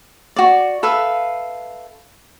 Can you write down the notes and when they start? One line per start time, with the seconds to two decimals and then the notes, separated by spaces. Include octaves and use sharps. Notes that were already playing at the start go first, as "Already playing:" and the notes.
0.36 F#4 D5
0.83 A4 B4 E5 F5